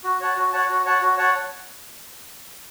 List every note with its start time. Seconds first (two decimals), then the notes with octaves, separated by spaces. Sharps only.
0.04 F#4
0.21 C#5 F#5 A5
0.37 F#4
0.53 C#5 F#5 A5
0.69 F#4
0.85 C#5 F#5 A5
1.02 F#4
1.17 C#5 F#5 A5